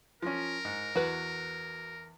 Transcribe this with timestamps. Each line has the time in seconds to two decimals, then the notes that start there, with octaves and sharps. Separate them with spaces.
0.22 F3 C#4 A#4
0.65 G#2
0.95 E2 F#4 B4